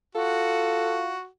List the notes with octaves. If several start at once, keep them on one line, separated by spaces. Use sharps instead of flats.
F4 F#4 A4